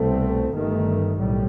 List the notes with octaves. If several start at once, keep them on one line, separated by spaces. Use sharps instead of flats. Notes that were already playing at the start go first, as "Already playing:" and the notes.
Already playing: C2 B2 A3 C4
G1 G2 D#3 A3
B1 A2 G3